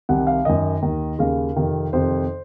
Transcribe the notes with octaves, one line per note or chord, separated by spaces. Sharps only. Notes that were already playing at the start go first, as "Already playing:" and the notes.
C2 C3 D#3 F#5
F5
F#2 D#3 D#5
D#2 D#3
D#2 C#3 F5
F2 C3 D#3
F2 C3 D#3 C5